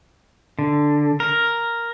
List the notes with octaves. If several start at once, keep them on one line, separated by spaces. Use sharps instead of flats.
D3
A#4